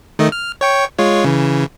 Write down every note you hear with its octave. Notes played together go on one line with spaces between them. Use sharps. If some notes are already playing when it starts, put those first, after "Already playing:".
D#3 A3 D#5
F6
C#5 G5 C#6
G#3 F4 C#5
C#3 E3